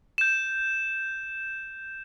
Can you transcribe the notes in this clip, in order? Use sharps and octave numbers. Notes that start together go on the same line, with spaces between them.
G6 E7